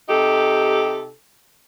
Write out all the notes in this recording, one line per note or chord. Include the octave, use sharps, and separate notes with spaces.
C3 D#4 G4 A4